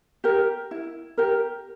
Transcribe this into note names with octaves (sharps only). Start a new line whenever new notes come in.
G4 A#4
E4
G4 A#4